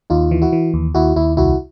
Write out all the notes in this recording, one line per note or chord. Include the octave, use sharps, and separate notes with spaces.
D#2 D#4 F4
E3
E4 F#4
E3
D#2
D#2 E4 F#4
D#2 E4
C2 E4 F#4